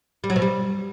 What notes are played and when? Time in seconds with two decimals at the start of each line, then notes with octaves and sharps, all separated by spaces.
0.24 G3
0.30 F#3
0.36 B2
0.42 G3